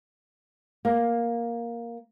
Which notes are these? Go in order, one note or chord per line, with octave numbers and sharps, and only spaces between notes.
A#3